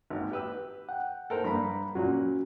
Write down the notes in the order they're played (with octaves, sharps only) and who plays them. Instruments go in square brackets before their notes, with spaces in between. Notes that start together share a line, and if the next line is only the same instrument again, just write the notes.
[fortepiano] G#1
G4 B4 E6
[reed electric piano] F#5 G5
[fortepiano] A4 A#4 C5
[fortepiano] G2 [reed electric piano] A#5 B5
[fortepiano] A#2 F#3 [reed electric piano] C#4 F#4